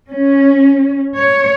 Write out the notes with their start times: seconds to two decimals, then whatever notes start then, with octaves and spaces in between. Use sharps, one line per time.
0.10 C#4
1.17 C#5